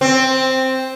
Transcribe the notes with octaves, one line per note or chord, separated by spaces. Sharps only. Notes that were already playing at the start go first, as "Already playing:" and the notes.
C4